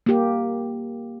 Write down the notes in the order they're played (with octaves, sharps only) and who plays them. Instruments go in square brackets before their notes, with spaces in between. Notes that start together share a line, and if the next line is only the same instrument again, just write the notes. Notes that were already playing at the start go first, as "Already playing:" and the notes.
[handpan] A#3 G4